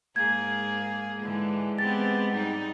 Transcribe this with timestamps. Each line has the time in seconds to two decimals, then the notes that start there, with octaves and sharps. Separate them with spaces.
0.16 G#2 A#3 G#4 G#6
1.22 G#2 D3 E3 G#3
1.78 B3 C4 G4 A6
2.33 G#2 G3 D#4